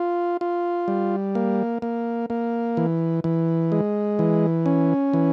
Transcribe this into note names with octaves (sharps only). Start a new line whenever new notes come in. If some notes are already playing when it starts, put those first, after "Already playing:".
Already playing: F4
F4
G3
A#3
A#3
A#3
E3
E3
G#3
E3
C#4
E3